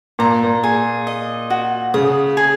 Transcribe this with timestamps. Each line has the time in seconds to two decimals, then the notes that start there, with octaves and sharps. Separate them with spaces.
0.19 A#2 A#5
0.44 A#2
0.63 G#4
1.07 D#5
1.50 F#4
1.94 C#3 D#6
2.37 G#4